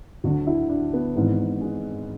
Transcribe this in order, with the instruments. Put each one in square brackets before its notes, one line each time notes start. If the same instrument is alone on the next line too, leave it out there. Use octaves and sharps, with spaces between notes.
[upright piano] D2 D3 F#3 F#4
E4
D4
B3
G#1 G#2 E3
G#3